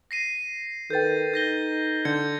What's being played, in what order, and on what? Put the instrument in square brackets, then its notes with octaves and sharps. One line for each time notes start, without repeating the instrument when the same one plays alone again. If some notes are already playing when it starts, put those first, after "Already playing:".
[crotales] A#6 C7 D#7
[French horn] D#3 [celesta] A4 B4 G5 [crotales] G6 A6
[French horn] D#4 [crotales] G6 A#6 G7
[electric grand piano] D3 [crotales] G6 G#6 C#7